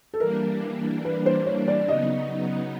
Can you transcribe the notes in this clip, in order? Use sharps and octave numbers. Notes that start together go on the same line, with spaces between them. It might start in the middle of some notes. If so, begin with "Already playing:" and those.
A4
E3 G3 A#3 D4 A#4
B4
C5
C#5
D5
C#3 F#3 B3 D#4 D#5